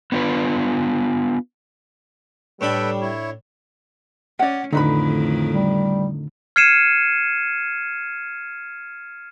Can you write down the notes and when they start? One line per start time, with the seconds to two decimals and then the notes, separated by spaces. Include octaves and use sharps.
0.12 B3 D4 F4 B4
2.61 A2 G3 D4 A4 B4 G5 B5
3.02 E4 C#5
4.39 C#4 D5 F#5
4.73 F2 A2 D3 D#3 D#4 B4 B5
5.52 G3
6.56 F6 G#6 C7 C#7 D#7 E7